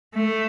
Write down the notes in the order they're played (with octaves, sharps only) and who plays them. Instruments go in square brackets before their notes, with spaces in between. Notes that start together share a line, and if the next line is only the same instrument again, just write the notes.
[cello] A3